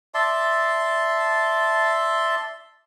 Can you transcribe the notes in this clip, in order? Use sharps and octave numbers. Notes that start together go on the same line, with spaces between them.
D5 E5 A5 C6